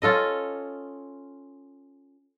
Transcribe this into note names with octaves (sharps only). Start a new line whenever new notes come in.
C#4 F4 A4 D#5